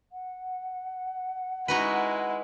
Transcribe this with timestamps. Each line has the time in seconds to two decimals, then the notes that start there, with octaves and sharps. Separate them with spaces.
0.12 F#5
1.68 G#3 D#4 E4 F#4 B4